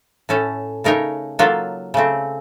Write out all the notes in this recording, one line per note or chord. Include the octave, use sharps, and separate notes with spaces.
A2 A3 C#4 A4
C#3 A3 D#4 A#4 C#5
F#3 A#3 F4 A4
C#3 A3 C4